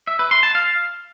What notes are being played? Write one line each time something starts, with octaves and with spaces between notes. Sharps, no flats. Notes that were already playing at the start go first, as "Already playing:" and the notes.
E5
B4
C6
A5
F5